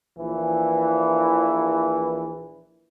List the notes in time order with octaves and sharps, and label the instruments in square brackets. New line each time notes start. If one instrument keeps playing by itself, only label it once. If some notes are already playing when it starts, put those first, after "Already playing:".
[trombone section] A#1 E3